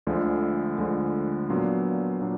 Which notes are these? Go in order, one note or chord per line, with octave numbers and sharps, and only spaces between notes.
D2 D3 F3 G#3
D2 D3 F3 G#3
A#2 F#3 B3 D4 F4
A#2 F#3 B3 D4